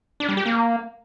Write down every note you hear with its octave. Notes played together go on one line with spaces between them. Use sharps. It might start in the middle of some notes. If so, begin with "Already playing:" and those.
D4
G3
G4
A#3